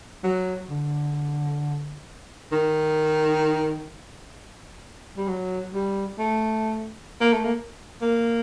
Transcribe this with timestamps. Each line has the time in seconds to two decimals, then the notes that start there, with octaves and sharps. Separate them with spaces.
0.24 F#3
0.70 D3
2.52 D#3
5.17 G3
5.28 F#3
5.73 G3
6.19 A3
7.21 A#3
7.33 A3
7.44 A#3
8.02 A#3